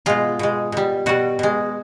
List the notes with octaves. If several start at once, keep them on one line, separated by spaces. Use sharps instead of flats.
B2 G#3 F4
B2 G#3
B2 G3
B2 G3 F#4
B2 G#3